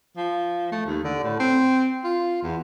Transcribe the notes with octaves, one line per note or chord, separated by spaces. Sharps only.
F3
A3
D#2
D3
A2
C4
F4
E2